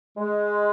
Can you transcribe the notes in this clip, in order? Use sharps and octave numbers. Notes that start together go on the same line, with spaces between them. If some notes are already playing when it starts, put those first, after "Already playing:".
G#3